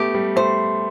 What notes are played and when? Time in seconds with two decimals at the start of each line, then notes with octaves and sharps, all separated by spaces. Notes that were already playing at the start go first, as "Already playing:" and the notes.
Already playing: A3 B3 G4
0.14 G3
0.36 A3 C5